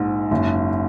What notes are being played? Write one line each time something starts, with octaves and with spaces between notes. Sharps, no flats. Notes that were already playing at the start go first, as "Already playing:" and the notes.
Already playing: A#1 G#2
F#1